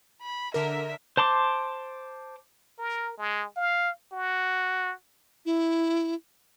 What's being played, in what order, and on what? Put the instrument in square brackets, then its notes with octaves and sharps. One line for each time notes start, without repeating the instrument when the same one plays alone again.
[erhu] B5
[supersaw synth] D3 A#4 [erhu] E5
[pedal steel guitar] C5 A5 C6 D6
[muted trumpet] A#4
G#3
F5
F#4
[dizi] E4